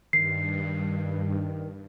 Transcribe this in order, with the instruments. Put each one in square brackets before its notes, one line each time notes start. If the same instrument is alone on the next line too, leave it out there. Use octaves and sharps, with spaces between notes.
[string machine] G2 [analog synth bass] D#3 [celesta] C7